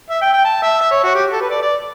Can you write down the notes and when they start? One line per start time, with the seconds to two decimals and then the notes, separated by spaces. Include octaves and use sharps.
0.10 E5
0.22 G5
0.33 G5
0.45 A5
0.63 E5
0.81 E5
0.92 C#5
1.04 F#4
1.15 G4
1.32 A4
1.41 B4
1.50 D5
1.62 D5